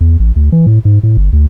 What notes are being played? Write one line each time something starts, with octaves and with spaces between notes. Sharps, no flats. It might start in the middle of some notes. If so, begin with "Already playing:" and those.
E2
A1
D2
E3
A2
G#2
A2
G1
D2